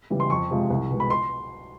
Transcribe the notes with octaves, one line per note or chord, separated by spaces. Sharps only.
C#3 E3 G3
C6
F2 C#6
C3 F3 G#3
C2
B2 G#3
B5
C6